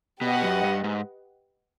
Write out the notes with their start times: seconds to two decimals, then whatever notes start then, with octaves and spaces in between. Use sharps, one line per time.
0.21 B2 G4 B4 D#5 F#5
0.42 F#2
0.64 G2
0.84 G#2